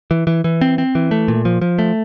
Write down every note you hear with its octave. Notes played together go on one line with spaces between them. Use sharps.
E3
E3
E3
C4
C4
E3
A3
A#2
F3
F3
A3